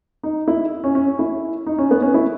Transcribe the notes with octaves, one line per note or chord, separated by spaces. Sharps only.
D#4
E4
C#4
C#4
E4
D#4
C#4
B3
C#4
E4